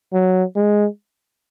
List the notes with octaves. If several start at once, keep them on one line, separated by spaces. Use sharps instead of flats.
F#3
G#3